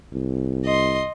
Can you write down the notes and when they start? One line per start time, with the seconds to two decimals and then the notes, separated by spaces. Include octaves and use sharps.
0.13 C2
0.64 D#5 C6